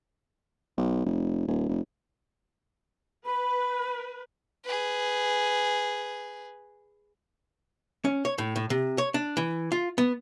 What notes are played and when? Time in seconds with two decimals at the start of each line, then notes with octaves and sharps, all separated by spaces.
0.78 B1
1.06 F1
1.47 D#1
1.69 F1
3.26 B4 B5
4.65 G#4 B4
8.05 C#4
8.25 C#5
8.38 A2
8.56 A2
8.70 C3
8.98 C#5
9.14 D4
9.37 E3
9.72 F4
9.98 B3